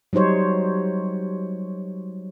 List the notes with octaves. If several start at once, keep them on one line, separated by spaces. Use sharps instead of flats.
F#3 G3 D#4 C5 C#5